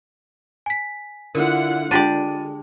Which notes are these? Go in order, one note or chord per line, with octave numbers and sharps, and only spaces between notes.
G#5 B6
D3 E4 F4 A#4 F#5
G#3 D4 F4 G4 D5 A6 D#7